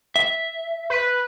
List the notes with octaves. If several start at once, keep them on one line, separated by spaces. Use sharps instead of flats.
E5
B4